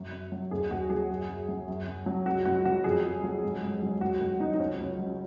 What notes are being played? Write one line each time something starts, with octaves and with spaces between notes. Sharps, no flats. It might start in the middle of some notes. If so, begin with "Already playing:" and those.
Already playing: F#2
F#2
F#3
D#2 G#4
D#2 F#4
F#3 G#4
F#2
F#2
F#3
F#2
F#2
F#3
C#2 F#4
C#2 F#4
F#3 F#4
F2 G#4
F2
F#3
G#2
G#2
F#3
D#2 F#4
D#2
F#3 D#4
D#4
C#2 C#4
C#2
F#3